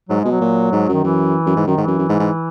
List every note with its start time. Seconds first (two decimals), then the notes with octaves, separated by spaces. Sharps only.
0.09 G#2 F#3
0.20 B2 G#3
0.31 F#3
0.40 A#2
0.72 G#2
0.88 F#2
0.93 D#3
1.04 F#2 E3
1.46 F#2
1.56 G#2
1.66 F#2 D#3
1.78 G#2
1.83 F#2 E3
1.98 F#2
2.09 G#2
2.19 G#2